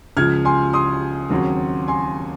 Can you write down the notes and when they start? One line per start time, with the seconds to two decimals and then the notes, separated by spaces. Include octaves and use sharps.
0.17 C#2 C#3 F3 F6 G#6
0.45 G#5 C6
0.73 C6 D#6
1.30 D#2 C#3 F#3 C4
1.88 G#5 C6